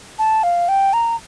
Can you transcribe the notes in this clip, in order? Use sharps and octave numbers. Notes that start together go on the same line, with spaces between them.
A5
F5
G5
A#5